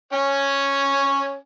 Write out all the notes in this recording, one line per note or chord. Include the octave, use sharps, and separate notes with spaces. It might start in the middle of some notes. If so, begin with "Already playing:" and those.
C#4 C#5 G#5